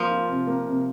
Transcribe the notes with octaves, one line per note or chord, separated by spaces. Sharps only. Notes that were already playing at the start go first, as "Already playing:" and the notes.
Already playing: F3 A#3
F4
C3
A#3
C3